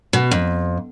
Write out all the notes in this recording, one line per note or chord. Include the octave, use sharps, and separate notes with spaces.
B2
F2